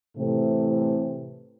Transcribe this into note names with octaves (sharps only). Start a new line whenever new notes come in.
A2 C3 E3 A3 C4 C5